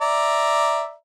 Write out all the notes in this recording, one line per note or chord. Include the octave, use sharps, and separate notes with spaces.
D5 E5 A#5